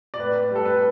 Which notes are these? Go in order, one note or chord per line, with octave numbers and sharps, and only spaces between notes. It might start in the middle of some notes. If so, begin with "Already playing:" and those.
D5
A2 B4
G3
A4
B4